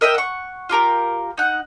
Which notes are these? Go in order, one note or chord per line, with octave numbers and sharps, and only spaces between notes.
A#4 D#5 E5 G5
F#5 C#6
F4 G4 A#4 A#5
D#4 F#5